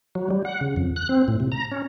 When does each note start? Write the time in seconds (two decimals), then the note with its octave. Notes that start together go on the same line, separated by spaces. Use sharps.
0.15 F#3
0.30 G3
0.45 F#5
0.61 C#3
0.76 F2
0.96 F#6
1.09 C4
1.28 A2
1.40 C3
1.52 A#5
1.71 C#4